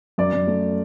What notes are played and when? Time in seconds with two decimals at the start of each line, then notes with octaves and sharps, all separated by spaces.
0.18 F#2 D5
0.33 F#2
0.47 A3